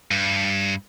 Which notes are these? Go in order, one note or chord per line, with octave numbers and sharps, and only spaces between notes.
G2